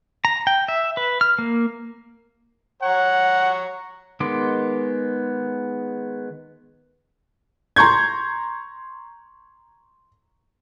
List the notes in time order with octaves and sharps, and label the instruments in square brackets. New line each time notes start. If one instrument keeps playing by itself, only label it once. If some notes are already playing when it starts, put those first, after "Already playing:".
[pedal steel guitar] A#5
G5
E5
B4
F6
A#3
[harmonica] C#5 A#5 C#6 [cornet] F#5
[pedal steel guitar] D#3 G#3 B3 C6 D6
[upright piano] A#5 C6 C#6 G6 G#6